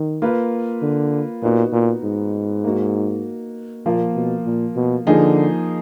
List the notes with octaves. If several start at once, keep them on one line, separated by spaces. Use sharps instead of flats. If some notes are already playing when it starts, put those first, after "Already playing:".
Already playing: D#3
A#3 F4 B4
D3
A#2 B3 D#4 F#4
A#2
G#2
A#3 D#4 F#4
A#2 F3 A#3 F4
B2
A#2
B2
D3 F3 A#3 D#4 G#4